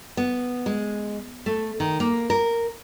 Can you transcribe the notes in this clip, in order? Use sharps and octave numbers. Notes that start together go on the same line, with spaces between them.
B3
G#3
A3
D#3
A#3
A#4